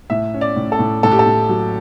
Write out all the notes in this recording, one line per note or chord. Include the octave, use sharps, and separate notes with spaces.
A2 E5
C#4
D5
A2
A4
A2
A2 A4
G4
A4
A2
F#3